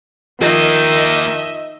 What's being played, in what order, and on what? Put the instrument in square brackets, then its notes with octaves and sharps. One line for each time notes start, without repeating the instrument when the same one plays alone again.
[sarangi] D#3 [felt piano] F3 [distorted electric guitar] A#3 D#4 [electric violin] D#5 E5